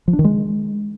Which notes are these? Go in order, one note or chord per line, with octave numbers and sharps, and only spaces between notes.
F3
D4
D#3
G#3